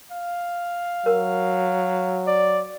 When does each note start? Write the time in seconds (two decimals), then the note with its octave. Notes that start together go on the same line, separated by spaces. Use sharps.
0.12 F5
1.06 F#3 A#4
2.27 D5